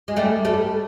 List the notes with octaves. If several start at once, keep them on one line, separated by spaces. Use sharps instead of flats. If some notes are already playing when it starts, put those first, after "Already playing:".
G#3
G3 A3
G3 A3